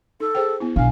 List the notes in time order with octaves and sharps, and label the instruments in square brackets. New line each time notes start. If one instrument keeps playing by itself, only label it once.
[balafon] D#4 [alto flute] A4
[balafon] G#4 C5 G5
B3 E4
[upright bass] B1 [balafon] D4 G#5 [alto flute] F5